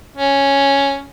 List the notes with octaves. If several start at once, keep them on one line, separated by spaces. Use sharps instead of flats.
C#4